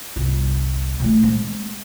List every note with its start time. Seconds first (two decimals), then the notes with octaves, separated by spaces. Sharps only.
0.16 G1 C2
1.00 A#2 A3
1.23 G#3 C4